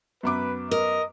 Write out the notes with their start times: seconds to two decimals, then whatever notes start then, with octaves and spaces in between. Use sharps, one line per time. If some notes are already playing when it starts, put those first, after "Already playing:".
0.23 F#2 B3 B4 D6
0.71 A#4 D#5